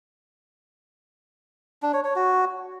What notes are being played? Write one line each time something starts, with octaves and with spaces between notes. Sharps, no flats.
D4
C#5
C#5
F#4